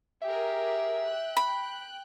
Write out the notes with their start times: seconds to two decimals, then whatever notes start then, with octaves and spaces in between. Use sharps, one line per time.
0.22 G4 G#4 A#4 E5
1.06 G5 F#6
1.37 B5